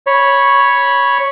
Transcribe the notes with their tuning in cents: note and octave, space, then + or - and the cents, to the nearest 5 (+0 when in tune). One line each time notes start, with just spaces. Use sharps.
C#5 +0 B5 -15